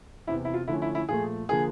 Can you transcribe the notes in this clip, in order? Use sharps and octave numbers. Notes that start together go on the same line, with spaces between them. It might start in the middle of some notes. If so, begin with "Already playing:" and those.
E2 C3 E3 E4
E4
F4
D3 F3 A3 C#4 E4
E4
E4
A#2 F3 A3 G#4
D3 F3 A#3 G#4